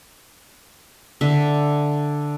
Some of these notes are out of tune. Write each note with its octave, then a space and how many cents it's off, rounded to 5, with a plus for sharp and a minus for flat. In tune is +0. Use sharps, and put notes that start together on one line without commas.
D3 +0 E5 +0